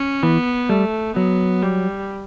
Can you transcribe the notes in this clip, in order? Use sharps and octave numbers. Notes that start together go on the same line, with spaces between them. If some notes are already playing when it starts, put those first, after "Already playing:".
Already playing: C#4
E3 B3
G3 A3
F#3 B3
G3